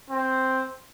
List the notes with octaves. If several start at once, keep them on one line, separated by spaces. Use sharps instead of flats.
C4